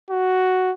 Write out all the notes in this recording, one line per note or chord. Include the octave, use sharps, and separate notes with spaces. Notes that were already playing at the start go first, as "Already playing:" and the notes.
F#4